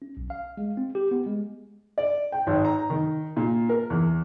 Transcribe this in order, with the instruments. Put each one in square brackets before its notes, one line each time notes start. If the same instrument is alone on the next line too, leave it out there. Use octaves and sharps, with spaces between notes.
[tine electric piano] C#4
B1
F5
G#3
C4
G4
B3
G#3
[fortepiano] D5
G5
G#1
A#5
D#3
A#2
A#4
E2